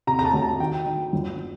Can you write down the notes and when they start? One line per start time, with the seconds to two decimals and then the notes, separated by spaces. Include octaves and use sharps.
0.07 C3 A#5
0.19 A#5
0.25 A5
0.34 D2
0.42 A5
0.60 D#3 G5
0.86 D#3
1.13 G1